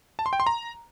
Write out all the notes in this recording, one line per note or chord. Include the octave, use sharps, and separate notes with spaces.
A5
C6
G5
C6
A#5